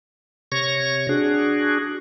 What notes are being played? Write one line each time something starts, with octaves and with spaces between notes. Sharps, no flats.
C3 C#5 C#6 A#6
D4 F#4 G#4